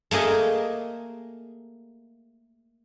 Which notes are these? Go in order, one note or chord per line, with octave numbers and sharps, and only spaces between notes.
A3 A#3 G#4 D#5 E5